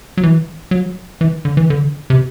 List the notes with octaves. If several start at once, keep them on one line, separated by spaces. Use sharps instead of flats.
F#3
E3
F#3
E3
D3
E3
D3
C3